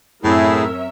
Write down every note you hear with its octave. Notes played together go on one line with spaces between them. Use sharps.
F#2 A2 C4 E4 G#4 A#4 C#5 E5